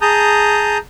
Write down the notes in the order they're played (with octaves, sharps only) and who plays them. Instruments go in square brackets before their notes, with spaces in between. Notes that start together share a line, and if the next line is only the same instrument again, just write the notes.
[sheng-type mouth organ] G#4 A5 A#5 D#6 G6